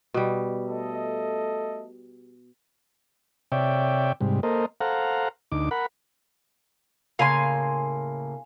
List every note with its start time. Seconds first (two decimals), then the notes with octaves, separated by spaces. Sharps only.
0.14 B2 G3
0.65 A3 A4 D#5
3.52 C3 C#5 D5 E5 G5
4.21 G#2 C3 G3
4.43 A#3 A4 A#4 C5 D#5
4.81 A4 C5 F5 F#5 A#5
5.52 D2 D#4 D6
5.71 A#4 F#5 B5
7.19 A2 C#3 A#3 F5 G#5 C6